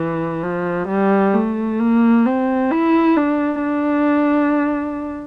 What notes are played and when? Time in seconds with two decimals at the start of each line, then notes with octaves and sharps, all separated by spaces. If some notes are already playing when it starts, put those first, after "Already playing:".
Already playing: E3
0.43 F3
0.88 G3
1.34 A3
1.80 A#3
2.26 C4
2.71 E4
3.16 D4
3.63 D4